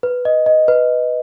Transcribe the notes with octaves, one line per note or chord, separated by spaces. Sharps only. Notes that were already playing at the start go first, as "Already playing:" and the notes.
B4
D#5
D#5
B4